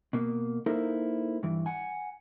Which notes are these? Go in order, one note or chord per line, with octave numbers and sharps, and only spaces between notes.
B2 A#3
A#3 D#4 E4 A4 A#4 C5
G2 E3
F#5 G#5